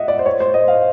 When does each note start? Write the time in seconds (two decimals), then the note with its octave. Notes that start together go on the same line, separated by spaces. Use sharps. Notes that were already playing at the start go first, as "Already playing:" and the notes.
Already playing: D#5 E5 F#5
0.08 D5
0.19 C5
0.26 C#5
0.40 C5
0.54 D#5
0.68 F5